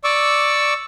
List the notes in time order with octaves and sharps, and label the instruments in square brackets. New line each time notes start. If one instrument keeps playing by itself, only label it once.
[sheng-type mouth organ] D5 C#6 D6 E6